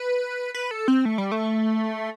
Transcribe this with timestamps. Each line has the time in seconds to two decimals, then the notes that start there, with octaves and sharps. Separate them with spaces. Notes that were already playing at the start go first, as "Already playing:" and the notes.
Already playing: B4
0.54 B4
0.71 A4
0.88 C4
1.05 A3
1.18 G3
1.32 A3